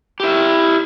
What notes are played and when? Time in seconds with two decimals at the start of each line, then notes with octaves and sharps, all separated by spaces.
0.20 E4 G4